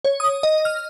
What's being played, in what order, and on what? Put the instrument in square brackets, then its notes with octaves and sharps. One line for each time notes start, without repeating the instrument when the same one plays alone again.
[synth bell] C#5
D#6
D#5
F6